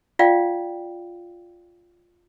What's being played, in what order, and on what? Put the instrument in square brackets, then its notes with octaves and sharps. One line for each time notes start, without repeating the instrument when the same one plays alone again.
[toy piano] F4 D5 F5 G5